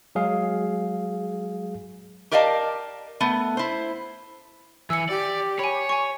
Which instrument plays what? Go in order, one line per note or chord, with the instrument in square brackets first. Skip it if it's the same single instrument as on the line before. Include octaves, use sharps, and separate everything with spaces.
[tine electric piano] F#3 G#3 G#4 F5
[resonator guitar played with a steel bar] G4 A#4 D5 D#5 F5 A5
A3 B3
E4 C5
[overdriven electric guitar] E3 [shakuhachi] G#5 [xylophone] E6 C#7
[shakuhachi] G4 [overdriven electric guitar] D5
[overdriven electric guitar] C#5 [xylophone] G#5 B5
[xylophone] G#5 C#6